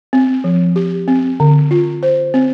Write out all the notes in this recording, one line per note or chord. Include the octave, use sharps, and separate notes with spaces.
C4
F3
G4
C4
D3
F4
C5
C4